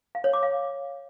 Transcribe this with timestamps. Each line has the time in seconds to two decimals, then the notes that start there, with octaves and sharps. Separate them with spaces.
0.15 F5
0.24 C#5
0.33 D6
0.43 F5